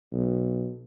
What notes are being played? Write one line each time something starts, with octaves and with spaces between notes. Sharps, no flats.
B1